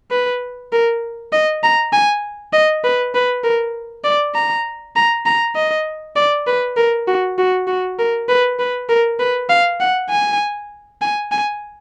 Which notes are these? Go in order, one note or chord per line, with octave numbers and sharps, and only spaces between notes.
B4
A#4
D#5
A#5
G#5
D#5
B4
B4
A#4
D5
A#5
A#5
A#5
D#5
D5
B4
A#4
F#4
F#4
F#4
A#4
B4
B4
A#4
B4
F5
F#5
G#5
G#5
G#5